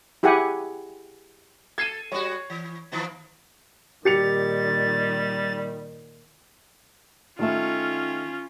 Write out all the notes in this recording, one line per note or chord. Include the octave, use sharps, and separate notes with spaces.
E4 G4 G#4 F#5 G#5
A4 G#6 C7 D#7
G3 F#4 C#5
E3
D#3 F3 B3
A#2 D#3 G3 G4 A6 C#7 F7
D#3 A3 C#4 F4 E5